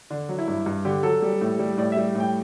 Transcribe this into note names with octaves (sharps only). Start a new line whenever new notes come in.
D3 D4
F#3
E4
G2
G2
D3 G4
F#3 A4
G3
A2
G3
A2 D5
E5
G3
A2 G5